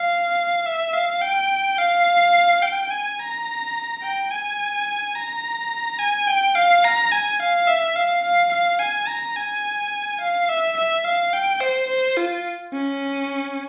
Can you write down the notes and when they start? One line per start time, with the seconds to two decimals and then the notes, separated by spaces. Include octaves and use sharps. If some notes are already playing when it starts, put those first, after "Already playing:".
Already playing: F5
0.66 E5
0.93 F5
1.22 G5
1.78 F5
2.62 G5
2.90 G#5
3.19 A#5
4.03 G5
4.31 G#5
5.15 A#5
5.99 G#5
6.28 G5
6.55 F5
6.84 A#5
7.12 G#5
7.40 F5
7.67 E5
7.96 F5
8.24 F5
8.52 F5
8.80 G#5
9.08 A#5
9.36 G#5
10.20 F5
10.49 E5
10.77 E5
11.05 F5
11.33 G5
11.61 C5
11.89 C5
12.17 F4
12.73 C#4